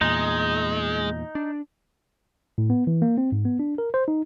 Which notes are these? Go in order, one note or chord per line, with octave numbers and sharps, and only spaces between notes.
E2 A#2 G#3 D#4
D4
A2
B3
E3
A#3
C4
G#2
B3
D4
A#4
C5
D#4